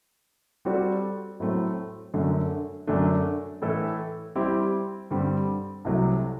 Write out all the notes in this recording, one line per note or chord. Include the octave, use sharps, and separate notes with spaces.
G3 C4 F#4 A4 D5
A2 F#3 A3 C4
F#2 D3 A3
F#2 D3 A3 D4
A2 E3 A3 E4 A4
G3 C4 E4 G4
G2 D3 G3 C4
C2 C3 F#3 A3